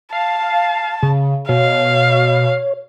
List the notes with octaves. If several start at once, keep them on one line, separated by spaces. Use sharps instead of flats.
F5 A5
C#3
B2 C#5 F5